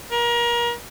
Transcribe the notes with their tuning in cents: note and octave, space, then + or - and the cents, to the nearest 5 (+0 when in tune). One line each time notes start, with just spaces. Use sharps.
A#4 +30